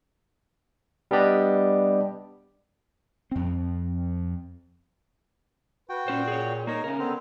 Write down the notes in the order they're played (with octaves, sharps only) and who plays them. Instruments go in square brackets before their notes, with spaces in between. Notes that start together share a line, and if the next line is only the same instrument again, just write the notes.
[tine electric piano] G3 B3 D4 G4 D5 D#5
[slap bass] F2 C4
[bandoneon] F#4 G5 [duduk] B4
[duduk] A#2 [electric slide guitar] C#4 C5
[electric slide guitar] G#4 C#5
[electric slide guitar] A#3 A#4 [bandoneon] D#4 C#5
[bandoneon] C#3 [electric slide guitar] C#4 A#4
[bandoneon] D3 C4 [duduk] B3